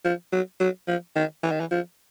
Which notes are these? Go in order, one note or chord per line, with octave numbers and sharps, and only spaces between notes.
F3
F#3
F#3
F3
D#3
E3
D#3
E3
F3